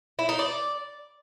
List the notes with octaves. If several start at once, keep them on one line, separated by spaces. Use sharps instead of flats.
E4
D#4
D5